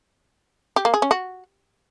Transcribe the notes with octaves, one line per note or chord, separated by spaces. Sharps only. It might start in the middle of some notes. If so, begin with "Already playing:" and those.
G4
A#3
G#4
C#4
F#4